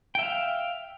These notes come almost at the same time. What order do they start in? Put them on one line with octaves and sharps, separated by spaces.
G5 E5 F5